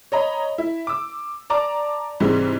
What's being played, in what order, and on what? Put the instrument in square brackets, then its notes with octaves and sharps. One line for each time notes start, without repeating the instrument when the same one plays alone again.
[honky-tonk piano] C#5 D#5 A#5 B5
E4
D6 E6
D5 A5 A#5 D6
G#2 C3 E3 G3 G#3 C4